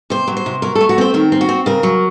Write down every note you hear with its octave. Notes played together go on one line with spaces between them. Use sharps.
C3 C5
F#3
C5
C3
F#3 A#4
A4
A3
F#4
C4 C5
D#3 A#4
C4
F#4
C4
C#3 A#4
F#3